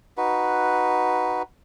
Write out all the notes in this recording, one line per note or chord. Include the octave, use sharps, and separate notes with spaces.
D#4 F#4 B4